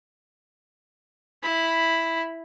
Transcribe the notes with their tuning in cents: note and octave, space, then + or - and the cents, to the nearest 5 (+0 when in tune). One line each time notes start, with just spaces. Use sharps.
E4 +0 B5 +0